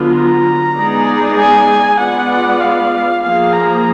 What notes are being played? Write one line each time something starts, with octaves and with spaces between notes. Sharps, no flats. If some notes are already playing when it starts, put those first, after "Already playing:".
Already playing: D3 F#3 B3 F4
A#5
G#3 B3 D#4 G#4 D5
G#5
G#3 B3 F4 B4 D5 F#5
F5
F3 A#3 F4 G#4 F5
A#5